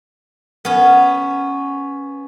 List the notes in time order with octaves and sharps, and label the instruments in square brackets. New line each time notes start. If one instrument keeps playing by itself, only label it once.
[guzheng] B3 C#4